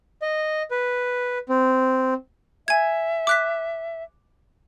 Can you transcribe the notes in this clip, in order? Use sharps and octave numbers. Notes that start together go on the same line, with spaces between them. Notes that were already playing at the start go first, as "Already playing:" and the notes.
D#5
B4
C4
E5 G#5 G#6
D6 F#6 B6